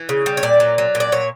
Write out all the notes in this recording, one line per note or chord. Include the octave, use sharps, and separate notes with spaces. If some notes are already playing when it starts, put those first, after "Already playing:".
Already playing: E3
C#3
G3
C#5
A#2 D5
F#3
F#3
A#2
D5
A#2 C#5